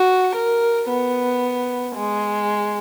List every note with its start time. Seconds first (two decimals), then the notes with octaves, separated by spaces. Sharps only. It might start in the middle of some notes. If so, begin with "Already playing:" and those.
Already playing: F#4
0.35 A#4
0.89 B3
1.96 G#3